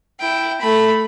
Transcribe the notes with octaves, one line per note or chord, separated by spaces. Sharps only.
E4 G5
A3 B5